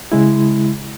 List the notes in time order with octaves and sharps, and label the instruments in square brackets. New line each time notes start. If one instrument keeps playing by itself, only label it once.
[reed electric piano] C#3 G#3 E4